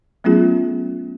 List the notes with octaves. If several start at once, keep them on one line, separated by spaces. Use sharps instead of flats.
F#3 A3 B3 C#4 F4 G#4